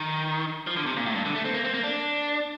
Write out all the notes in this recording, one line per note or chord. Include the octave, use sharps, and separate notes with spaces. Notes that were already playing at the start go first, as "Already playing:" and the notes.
Already playing: D#3
F3
D3
C3
A#2
A2
G2
D3
A3
C4
A#3
C4
A#3
D4